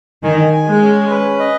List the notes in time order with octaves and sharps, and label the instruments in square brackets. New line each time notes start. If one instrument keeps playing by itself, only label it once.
[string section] D#3 [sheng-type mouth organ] G#5
[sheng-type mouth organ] G#5
[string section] G#3
[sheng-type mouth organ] C#4
B4
D#5